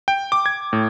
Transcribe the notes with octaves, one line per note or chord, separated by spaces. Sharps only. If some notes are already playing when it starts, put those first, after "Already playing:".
G5
D6
G#6
A2